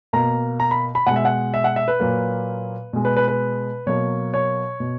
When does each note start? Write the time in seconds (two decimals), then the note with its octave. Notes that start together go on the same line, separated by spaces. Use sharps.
0.13 B2 A#3 A#5
0.60 A#5
0.71 B5
0.95 B5
1.07 B2 G#3 F#5
1.16 E5
1.25 F#5
1.54 E5
1.64 F#5
1.76 E5
1.88 B4
2.00 A#2 F#3 A#3
2.93 B2 G#3
3.05 B4
3.17 B4
3.28 B4
3.86 B2 F#3 A#3 C#5
4.34 C#5
4.80 B2